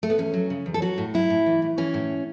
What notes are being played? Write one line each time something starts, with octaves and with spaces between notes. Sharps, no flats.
A3
B3
E2 C#4
F#3
C#3
E2
A4
F#3 F#4
A2
F#3 E4
A2
E3
A2
E3 C#4
A2